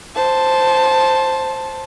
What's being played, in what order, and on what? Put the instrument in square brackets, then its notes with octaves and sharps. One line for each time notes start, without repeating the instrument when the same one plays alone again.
[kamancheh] C5 A5